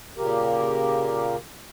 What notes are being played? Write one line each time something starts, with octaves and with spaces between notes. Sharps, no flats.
A#2 C#3 A#3 G4 A#4